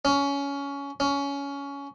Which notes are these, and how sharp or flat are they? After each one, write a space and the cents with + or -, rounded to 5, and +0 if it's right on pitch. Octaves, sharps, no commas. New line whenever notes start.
C#4 +20
C#4 +20